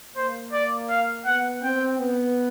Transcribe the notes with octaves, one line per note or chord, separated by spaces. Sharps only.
A#3 C5
D5
F5
B3 F#5
C4 G5
B3